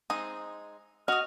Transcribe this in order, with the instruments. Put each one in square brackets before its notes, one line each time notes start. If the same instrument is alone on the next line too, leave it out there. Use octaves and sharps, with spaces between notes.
[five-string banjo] G#3 C4 D#4 [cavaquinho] D#6
[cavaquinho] F#4 D#6 [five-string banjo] D#5 [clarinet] F6